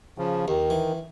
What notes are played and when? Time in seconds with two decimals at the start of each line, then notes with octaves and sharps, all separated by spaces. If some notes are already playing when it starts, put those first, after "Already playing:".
0.18 C#3 F3
0.48 D#2 D#3
0.70 E3